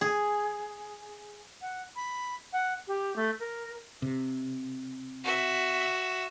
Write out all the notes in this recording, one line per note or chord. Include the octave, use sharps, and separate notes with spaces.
G#4
F#5
B5
F#5
G4
A3
A#4
C3
F#4 E5